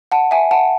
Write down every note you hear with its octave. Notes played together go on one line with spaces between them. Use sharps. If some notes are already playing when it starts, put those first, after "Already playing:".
F#5 A5
E5 G#5
F#5 A5